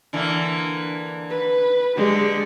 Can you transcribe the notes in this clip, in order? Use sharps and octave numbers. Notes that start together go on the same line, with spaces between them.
D3 E3 A#3
B4
D3 G#3 G4